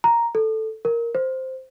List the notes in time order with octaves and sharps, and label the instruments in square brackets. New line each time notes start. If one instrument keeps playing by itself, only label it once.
[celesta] A#5
A4
A#4
C5